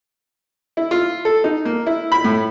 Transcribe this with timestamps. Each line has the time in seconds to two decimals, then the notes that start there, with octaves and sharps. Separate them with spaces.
0.77 E4
0.91 F4
1.25 A4
1.44 D#4
1.65 A#3
1.86 E4
2.12 B5
2.24 A2